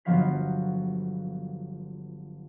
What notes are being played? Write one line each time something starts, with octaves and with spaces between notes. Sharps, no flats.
G1 F3 F#3 B3 F5 B6